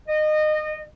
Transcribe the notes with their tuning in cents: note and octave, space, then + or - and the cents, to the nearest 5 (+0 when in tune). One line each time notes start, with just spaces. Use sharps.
D#5 -25